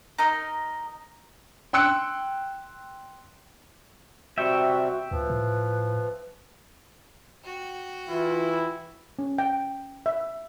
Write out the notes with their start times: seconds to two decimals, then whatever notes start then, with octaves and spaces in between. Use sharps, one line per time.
0.18 D#4 A#4 D#5
1.73 G5 C6 E6 F#6 C#7 D7
4.38 C3 G3 C4 F#4 E5 G5 C#6
5.11 D2 F3 B4
5.30 A2
7.45 F#4 G5
8.09 E3 E4 F4
9.19 C#4
9.38 G5
10.06 E5